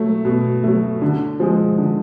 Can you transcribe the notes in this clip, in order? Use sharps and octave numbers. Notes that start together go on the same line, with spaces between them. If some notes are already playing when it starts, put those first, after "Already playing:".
Already playing: F#3 A3
B2
F#3 A3
D3
F3 G#3
D3